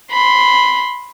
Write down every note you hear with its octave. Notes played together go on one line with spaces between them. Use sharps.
B5 C6